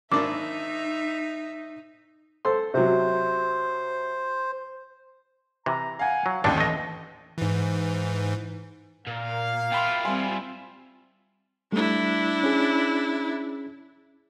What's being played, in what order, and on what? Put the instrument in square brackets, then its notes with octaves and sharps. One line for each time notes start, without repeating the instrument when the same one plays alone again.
[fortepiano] G#1 A#3 D4 [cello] D#4 [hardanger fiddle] E5 [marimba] D6
[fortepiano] A4 C5 C6
[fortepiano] C3 F#3 [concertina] C5
[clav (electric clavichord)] C3 E3 [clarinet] A#5
[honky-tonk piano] F5 F#5 [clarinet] G#5
[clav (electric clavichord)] F#3
[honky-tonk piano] A1 D#2 [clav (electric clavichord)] D3 A3 D4 [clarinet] G5
[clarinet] E3 [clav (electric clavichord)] A3 D#5
[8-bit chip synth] G#2 E3
[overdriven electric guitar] A#2 [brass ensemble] A#3 A#4 F5
[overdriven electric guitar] E4 F4 [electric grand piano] G5 B5 C6
[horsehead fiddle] G3 C4 [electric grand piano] E5 G#5 C6
[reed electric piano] G3 A3 [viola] D4 E4
[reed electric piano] C#4 G#4